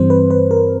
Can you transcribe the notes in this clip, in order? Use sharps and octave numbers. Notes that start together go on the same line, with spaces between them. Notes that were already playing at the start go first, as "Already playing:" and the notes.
Already playing: G2 E3 G3 C4 C5
B4
B4
A#4